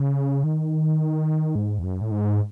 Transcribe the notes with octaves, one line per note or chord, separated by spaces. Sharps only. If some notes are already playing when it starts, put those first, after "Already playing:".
Already playing: C#3
D#3
G#2
E2
F#2
A2
G#2